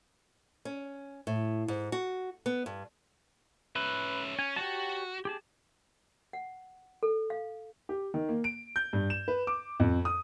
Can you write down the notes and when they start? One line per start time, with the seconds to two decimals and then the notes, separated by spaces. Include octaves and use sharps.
0.65 C#4
1.27 A2
1.68 G#2
1.92 F#4
2.46 B3
2.66 G2
3.76 C#4 B4 E5
4.39 C#4 G#5
4.56 F#4 G4 C#5 A5
5.25 G4 G#4 A5
6.33 F#5
7.03 A4
7.30 F5
7.89 G4
8.14 D#3
8.29 A#3
8.44 D7
8.76 G6
8.93 G2
9.10 E7
9.28 B4
9.47 D6
9.80 F2
10.05 D#6